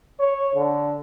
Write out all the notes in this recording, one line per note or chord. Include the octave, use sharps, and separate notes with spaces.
C#5
D3